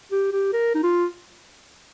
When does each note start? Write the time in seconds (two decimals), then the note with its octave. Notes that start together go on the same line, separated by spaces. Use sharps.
0.12 G4
0.32 G4
0.53 A#4
0.75 D#4
0.83 F4